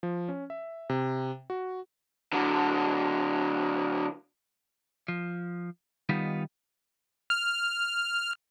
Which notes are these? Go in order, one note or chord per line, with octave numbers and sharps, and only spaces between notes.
F3
C#4
E5
C3
F#4
D3 F#3
F3
D#3 G3 B3 D#4 F4
F6